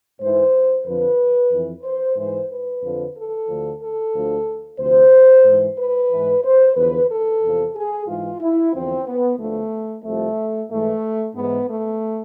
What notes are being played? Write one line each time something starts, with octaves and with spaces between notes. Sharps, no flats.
G#2 E3 C5
F2 D3 F3 B4
F2 E3
C5
G#2 E3 C5
B4
F2 D3 F3
A4
D2 D3 F3
A4
D2 D3 F3
D2 C3 F3 C5
G#2 E3
B4
G#2 E3
C5
E2 D3 F3 B4
A4
E2 C3 F3
G#4
G#2 E3 F4
E4
E2 D3 F3 C4
B3
D2 D3 F3 A3
C2 C3 F3 A3
G#2 E3 A3
G#2 E3 B3
A3